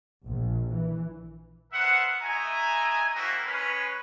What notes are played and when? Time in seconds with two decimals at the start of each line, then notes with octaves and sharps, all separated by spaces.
0.24 A#1
0.69 E3
1.72 B3 A#4 C5 E5 F#5
2.21 A3 E4 D#5 E5 G#5 A#5
3.14 A#3 C4 E4 F#4 A4 A#4
3.45 G#3 C#4 B4